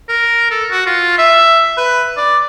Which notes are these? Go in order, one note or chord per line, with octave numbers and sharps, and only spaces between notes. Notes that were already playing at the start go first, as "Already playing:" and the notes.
A#4
A4
F#4
F4
E5
B4
D5